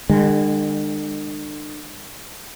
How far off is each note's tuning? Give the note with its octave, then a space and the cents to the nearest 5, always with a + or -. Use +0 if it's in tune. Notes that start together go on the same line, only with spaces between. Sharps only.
D3 +40 G#3 -40